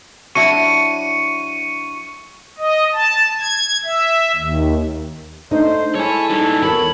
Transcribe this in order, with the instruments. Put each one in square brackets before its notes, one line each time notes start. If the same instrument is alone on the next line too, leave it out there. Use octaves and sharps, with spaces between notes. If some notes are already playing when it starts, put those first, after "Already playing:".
[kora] F#3 D4 E4 [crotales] C#6 C#7 D#7
[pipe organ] D#5
A5
G#6
E5
D#2
[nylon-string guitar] A3 D4 D#4 [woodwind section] C5
[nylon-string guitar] G#3 [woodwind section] E4 [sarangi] A4 [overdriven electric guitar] C#5 G#5
[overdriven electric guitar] G3 D#4
[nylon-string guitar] E2 A#4 A5 [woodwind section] C#5 [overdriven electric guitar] B5